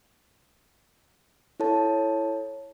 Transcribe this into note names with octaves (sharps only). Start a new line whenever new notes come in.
E4 A4 C#5 A5